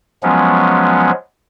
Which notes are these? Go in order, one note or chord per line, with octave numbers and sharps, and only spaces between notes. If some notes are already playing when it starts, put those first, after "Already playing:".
F3 F#3 G#3 B3 C#4